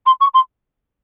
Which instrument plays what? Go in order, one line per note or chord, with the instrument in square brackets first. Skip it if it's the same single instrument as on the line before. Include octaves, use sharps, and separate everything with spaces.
[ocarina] C6
C#6
C6